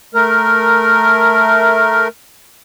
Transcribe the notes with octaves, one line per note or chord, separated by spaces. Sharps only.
A3 A#4